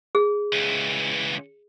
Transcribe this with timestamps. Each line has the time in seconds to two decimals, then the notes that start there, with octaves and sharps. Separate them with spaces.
0.15 G#4
0.53 C#2 E3